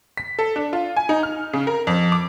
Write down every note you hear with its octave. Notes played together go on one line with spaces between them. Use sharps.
B6
A4
D4
F4
G#5
D#4
F6
C#3
A#4
F2
D6